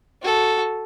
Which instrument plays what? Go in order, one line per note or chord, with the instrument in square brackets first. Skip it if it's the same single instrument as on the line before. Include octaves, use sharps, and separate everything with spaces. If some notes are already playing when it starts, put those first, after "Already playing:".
[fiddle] F#4 A4